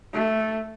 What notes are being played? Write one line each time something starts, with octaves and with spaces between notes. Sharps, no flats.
A3